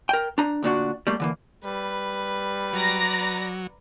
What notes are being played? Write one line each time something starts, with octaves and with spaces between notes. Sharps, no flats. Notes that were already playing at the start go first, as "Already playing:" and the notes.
A#4 G5
D4 A#5
D2 A#2 D4 F#4
G3 A3 A#3
D3 E3 A#3
G3 B4
F#3 D5 A#5 A#6